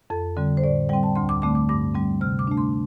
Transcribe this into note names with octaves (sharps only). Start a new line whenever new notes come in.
F2 A4
D3 G3 C4
C5
A2 D5
G3 C4 G5
A5
D2 C6
D6
D3 A3 C4 D6
D6
G2 D6
G3 C4
C3 F6
D6
A3 D4
C6